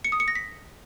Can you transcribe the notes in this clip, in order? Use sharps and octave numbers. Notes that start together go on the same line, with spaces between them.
C#7
D#6
C#7
A#6
B6